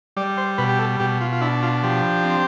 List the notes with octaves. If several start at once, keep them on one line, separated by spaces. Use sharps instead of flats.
G3 D5
C5
B2 B4
G4
A4
B2 G4
F4
F4
D4 E4
F4
F3 G4
C4